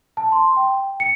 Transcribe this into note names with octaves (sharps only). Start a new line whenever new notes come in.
A5
C6
G5
C#7